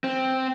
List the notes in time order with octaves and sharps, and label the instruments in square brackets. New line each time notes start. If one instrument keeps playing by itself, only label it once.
[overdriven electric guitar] C4